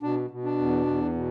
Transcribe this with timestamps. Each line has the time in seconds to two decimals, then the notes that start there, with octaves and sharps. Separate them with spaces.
0.03 B2 D4
0.30 B2
0.44 D4
0.59 E2
0.86 E2
1.15 B2